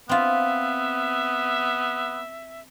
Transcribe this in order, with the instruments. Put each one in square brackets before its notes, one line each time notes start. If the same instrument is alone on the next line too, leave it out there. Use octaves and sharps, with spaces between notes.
[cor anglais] B3 [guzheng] C4 F4 [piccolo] E5